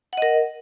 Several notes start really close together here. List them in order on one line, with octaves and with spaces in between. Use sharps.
F#5 D#5 A#4